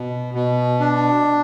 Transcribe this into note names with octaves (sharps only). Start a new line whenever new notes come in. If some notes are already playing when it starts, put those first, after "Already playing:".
Already playing: B2
B2
D4